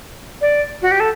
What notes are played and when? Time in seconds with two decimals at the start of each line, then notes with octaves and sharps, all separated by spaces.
0.41 D5
0.82 F#4
0.91 G4
1.00 A4